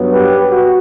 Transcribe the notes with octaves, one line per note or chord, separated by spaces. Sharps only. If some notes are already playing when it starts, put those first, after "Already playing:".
Already playing: G2 F#3 B3
G4 B4
F#4